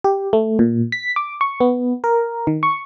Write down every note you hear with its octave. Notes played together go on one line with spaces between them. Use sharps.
G4
A3
A#2
B6
D6
C#6
B3
A#4
D#3
C#6